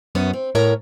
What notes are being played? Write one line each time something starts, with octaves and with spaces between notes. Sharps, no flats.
F#2 B3 C#4
C4
A2 A#4 C#5 A#5